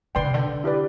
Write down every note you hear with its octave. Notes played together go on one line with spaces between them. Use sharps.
D3 B4 D5 G5 C6
C3
D3
E4 G4 B4 D5